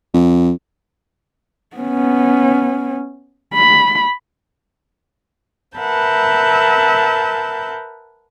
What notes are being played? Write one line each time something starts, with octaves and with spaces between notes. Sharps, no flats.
F2
B3 C#4
B5
A#4 B4 E5 F#5 A5 G6